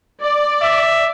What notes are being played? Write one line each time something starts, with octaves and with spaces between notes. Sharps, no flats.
D5
E5